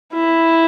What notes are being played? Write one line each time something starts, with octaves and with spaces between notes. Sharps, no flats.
E4